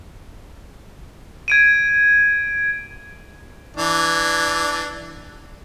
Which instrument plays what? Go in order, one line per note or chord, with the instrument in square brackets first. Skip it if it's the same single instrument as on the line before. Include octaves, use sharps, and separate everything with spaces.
[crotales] G#6 D7 D#7
[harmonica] E3 D4